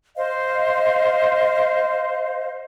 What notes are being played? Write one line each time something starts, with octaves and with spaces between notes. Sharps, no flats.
C5 D#5 F5